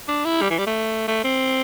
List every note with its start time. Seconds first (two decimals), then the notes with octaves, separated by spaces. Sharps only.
0.08 D4
0.25 E4
0.42 G3
0.50 E3
0.58 G3
0.67 A3
1.08 A3
1.24 C4